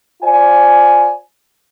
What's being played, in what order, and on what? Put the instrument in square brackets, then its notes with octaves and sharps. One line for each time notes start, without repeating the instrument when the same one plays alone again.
[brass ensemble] F4 C5 D5 G#5